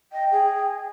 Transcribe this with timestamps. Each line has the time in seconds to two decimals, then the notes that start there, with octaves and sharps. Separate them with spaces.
0.12 D#5 G5
0.31 G#4